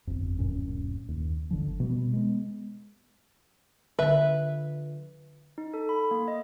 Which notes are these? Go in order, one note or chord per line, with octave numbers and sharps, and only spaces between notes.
G1 F2
D1 F#2 A#2 C#4
D#2
G1 D3 F3
B2 G3 B3
G#3 B3
D3 F3 B4 E5
D#4
A4
B5
A#3
D#5